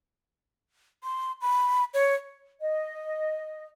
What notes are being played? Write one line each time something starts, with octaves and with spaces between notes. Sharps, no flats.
C6
B5
C#5
D#5